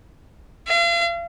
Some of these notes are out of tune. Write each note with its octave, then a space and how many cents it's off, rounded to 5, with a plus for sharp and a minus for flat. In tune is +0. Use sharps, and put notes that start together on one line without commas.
F5 -40